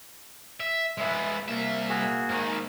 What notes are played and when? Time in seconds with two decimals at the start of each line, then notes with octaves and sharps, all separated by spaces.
0.60 E5
0.98 G#3 B3 E5
1.48 C2 A#3 E5
1.89 F#4 G#4
2.29 G#2 D#3